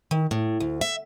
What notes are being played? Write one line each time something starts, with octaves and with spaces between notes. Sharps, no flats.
D#3
A2
D2
E5